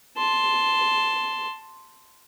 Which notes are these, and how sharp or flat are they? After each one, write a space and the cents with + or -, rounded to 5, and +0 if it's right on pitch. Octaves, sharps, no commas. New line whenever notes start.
A5 +0 C6 +0